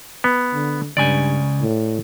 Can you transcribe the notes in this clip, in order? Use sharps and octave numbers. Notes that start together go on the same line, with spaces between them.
B3
D3
C#2 G2 C#3 D5 G#5
A2